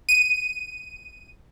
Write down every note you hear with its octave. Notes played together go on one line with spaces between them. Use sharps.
D#7